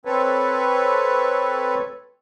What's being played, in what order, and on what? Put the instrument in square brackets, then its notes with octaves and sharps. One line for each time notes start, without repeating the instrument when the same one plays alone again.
[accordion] C4 A4 B4 C#5